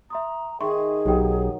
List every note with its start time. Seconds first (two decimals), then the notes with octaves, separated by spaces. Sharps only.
0.10 E5 A#5 C6 D#6
0.60 D#3 G#4 E5 C6 C#6
1.06 B1 F#3 G4 G5